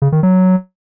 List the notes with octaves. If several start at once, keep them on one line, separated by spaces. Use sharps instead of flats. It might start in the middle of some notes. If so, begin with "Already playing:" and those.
C#3
D#3
F#3